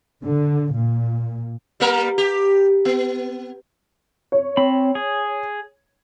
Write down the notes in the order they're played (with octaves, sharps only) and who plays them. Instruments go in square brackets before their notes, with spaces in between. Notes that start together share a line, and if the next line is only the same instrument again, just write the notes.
[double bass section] D3
A#2
[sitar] G3 A#3 A#4
G4
B3
[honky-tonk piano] C#5
[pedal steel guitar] C4 B5
G#4